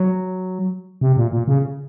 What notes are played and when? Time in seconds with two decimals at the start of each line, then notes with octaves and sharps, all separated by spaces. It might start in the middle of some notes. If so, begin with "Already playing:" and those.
Already playing: F#3
1.01 C3
1.17 A#2
1.33 A#2
1.48 C#3